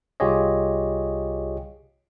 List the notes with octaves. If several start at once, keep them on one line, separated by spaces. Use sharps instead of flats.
C2 F4 G4 G#4 C#5 D#5